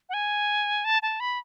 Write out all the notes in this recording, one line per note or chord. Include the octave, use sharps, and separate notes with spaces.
F#5
G#5
A5
A5
B5